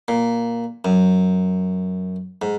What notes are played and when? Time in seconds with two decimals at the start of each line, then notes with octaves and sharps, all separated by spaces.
0.08 A#2
0.85 F#2
2.42 G#2